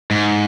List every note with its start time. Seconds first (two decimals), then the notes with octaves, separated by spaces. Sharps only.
0.11 G#2